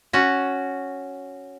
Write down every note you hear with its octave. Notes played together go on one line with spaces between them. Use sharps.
C#4 F#4